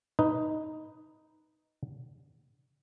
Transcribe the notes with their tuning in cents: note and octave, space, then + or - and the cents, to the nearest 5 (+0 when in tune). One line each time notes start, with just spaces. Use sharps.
D#4 +0 B4 +0